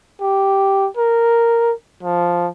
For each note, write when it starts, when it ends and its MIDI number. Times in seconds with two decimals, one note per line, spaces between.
0.21 0.88 67
0.97 1.73 70
2.03 2.48 53